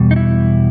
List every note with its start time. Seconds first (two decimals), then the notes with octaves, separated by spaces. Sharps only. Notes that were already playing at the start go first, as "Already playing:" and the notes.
Already playing: E2 B2 G3
0.11 D#4
0.16 E4